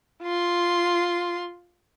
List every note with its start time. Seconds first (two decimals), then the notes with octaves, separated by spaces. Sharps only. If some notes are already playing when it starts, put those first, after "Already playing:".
0.23 F4 C6